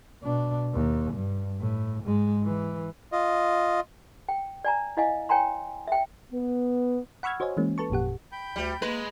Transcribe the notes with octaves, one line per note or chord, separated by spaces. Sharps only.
B2 D4
D#2
G2
A2
G#2 G#3
E3
F4 D#5
G5
D5 G#5 A#5
E4 D#5 F5 G#5
C#5 G5 G#5 A#5 C6
E5 G5
B3
F#5 B5 C#6 E6 F6 G#6
F#4 C5 C#5 D#5 G#5
E3 G#3 A#3 C#4
A4 B4 A5 C#6
G#1 F2 A#2 G4 F#5
G5 B5 G6
D2 G3
G#3 A#3 B4